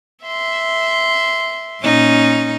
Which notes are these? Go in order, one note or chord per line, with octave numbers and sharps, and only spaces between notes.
E5 C6
A#2 C#4 D#4